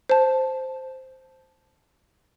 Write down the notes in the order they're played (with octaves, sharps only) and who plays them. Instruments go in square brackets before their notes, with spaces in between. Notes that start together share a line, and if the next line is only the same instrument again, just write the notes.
[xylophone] C5 A5